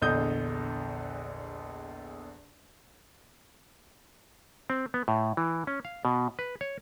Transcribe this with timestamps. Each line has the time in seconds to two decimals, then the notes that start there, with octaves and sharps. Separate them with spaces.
0.02 A#1 E2 D3 D#5 D#6 G6
4.70 C4
4.94 B3
5.08 A2
5.37 E3
5.67 C#4
5.85 F5
6.05 B2
6.39 B4
6.61 C#5